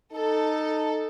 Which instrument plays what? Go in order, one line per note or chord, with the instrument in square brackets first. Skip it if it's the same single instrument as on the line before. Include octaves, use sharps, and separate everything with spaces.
[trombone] D#4 [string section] A4